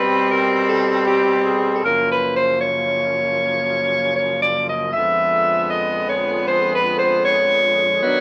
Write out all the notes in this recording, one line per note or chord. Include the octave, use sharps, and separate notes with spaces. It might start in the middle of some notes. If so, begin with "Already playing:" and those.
Already playing: B2 G3 C4 B4
A#4
A4
G4
G#4
A4
F#2 C#3 F3 A#3 A#4
B4
C5
C#5
C#5
D5
D#5
F2 D3 F3 G#3 B3 E5
D#5
C#5
C5
B4
C5
C#5
D#3 F#3 B3 D4